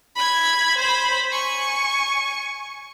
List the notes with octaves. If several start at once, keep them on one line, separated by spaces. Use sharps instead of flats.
B5 G#6
C5 B5
G#5 C#6